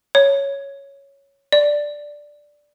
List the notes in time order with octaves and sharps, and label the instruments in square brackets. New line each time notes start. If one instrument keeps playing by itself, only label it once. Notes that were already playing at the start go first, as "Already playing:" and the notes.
[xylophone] C#5
D5